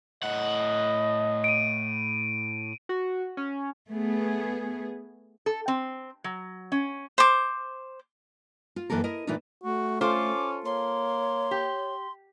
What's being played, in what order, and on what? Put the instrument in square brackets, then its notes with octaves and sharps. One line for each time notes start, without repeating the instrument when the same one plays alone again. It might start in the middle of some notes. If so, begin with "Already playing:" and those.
[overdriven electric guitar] A2 F#5 [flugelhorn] D#5
[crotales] D7 D#7
[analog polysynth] F#4
C#4
[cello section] A3 B3 G#4
[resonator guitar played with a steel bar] A4
C4
F#3
C#4
[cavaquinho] C5 D6
[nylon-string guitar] F4
F#2 E3 A#3 A4 A#4
E4 A#4 D#5
A#2 E3 A3 D4 D#4 F4
[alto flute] A3 [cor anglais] F#4
[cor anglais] C#4 [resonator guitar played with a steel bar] F4 A4 C5 [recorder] D6
[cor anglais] A#3 [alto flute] C#5 [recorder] C6
[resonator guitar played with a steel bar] G4